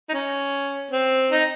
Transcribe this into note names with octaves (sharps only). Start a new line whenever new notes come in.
D#4
C#4
C4
D#4